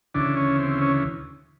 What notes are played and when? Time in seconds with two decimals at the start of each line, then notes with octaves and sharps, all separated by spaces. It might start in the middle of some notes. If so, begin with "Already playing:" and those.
0.14 D2 C#3 E3 D4
0.37 C#4
0.59 C4
0.81 C#4